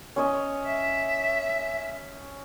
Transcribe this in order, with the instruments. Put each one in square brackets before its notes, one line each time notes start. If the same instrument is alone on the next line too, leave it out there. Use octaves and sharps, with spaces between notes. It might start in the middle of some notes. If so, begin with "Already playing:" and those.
[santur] C#4 C#5 D#5
[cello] E5